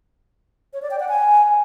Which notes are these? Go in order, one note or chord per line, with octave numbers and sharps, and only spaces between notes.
C#5
D5
G5
F#5
G#5